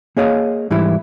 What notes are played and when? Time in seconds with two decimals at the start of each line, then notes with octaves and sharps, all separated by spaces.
0.17 A#3 G#4 C#5 D#5 F5
0.71 G#2 E3 G3 E4